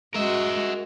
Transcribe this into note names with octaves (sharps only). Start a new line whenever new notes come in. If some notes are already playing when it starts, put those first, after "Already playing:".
G#3 F#4 A#4 E5